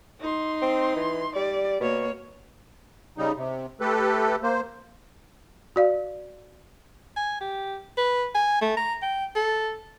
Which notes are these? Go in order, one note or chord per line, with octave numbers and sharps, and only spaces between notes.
D#4 C6
C4
E3
G3 D5
B2 A#3 C#5
C#3 G3 D#4
C3
A3 G4 A4 B4
A#3 C5
F#4 D5 F5
G#5
G4
B4
G#5
A3
A#5
G5
A4